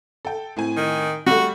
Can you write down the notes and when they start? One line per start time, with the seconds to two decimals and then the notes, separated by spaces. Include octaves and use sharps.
0.25 A4 G5
0.57 A2 C4 G#5
0.77 D#3
1.26 G3 A3 F#4